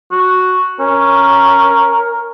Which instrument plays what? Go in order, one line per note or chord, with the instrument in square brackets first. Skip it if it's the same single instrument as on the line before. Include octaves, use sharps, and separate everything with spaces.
[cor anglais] F#4
[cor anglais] C#4 [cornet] A#4